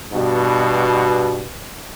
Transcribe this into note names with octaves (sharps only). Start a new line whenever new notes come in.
G2 B2